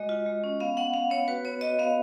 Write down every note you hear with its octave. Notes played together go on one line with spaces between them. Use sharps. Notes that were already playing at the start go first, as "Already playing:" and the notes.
Already playing: G#3 F#4 D#5
F4
G#3
C#4
B3 F5
B3 F#5
B3 F5
B3 C#5
F#4 B4
B3 C#5
F#4 D#5
B3 F5